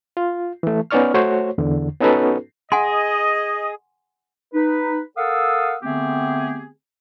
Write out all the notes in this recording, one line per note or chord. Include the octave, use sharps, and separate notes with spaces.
F4
E3 A3
B3 C#4 D#4 D5 C#6 F6
A3 F#4 C5 C#5
E2 D3
B3 C#4 D#4 F#4 A4 B4
G#4 D#5 F#5 G#5 C6
D#4 B4
A4 A#4 F5 F#5 D#6 E6
D3 A3 B3 C4 G4 G#4